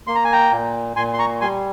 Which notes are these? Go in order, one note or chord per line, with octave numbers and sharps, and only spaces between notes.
A#3 C6
A#5
G#5
G5 A#5
A#2
A#2 G#5 C6
C6
A#5 C#6
G3 G#5 C6